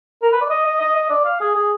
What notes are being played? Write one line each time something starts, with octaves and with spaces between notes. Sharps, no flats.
A#4
B4
D5
D#5
D#5
D#5
D#5
D5
F5
G#4
G#4